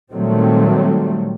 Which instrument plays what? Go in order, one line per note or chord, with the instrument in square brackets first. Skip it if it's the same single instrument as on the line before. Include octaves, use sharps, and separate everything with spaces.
[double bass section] A#2 D#3 F#3 G3 A3 C4